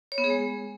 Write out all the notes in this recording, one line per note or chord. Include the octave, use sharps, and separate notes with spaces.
C#5
B3
G#4
G#3